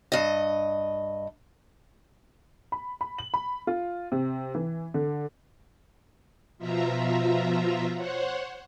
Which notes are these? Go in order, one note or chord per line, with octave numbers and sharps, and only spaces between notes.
G2 D#5
B5
B5
F#7
B5
F4
C3
E3
D3
B2 F3 F4 E5 A#5
C5 C#5 F#5